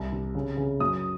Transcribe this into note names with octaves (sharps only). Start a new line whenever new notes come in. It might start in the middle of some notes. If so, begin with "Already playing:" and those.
Already playing: C2
C3
C#3
C#3
F#2 D#6